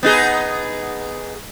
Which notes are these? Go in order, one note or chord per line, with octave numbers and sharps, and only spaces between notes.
B3 D#4 G#4